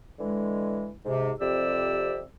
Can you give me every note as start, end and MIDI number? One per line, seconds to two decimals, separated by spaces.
0.19 0.89 50
0.19 0.89 52
0.19 0.89 56
1.06 1.32 44
1.06 1.32 48
1.40 2.22 41
1.40 2.22 48
1.40 2.22 67
1.40 2.22 74
1.40 2.22 88